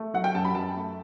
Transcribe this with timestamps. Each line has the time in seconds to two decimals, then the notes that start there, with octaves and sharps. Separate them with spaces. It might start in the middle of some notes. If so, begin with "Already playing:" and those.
Already playing: A3
0.14 F#3 F#5
0.24 G5
0.35 F#2 A5
0.45 B5
0.55 F#2 A5
0.76 A3